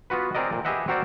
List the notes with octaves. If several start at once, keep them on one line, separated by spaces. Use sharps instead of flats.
B3 F4 F#4 B4
C4 G#4 A#4 D5 D#5
A#2
G4 G#4 B4 D#5 E5 F#5
C4 F#4 A#4 C5 D5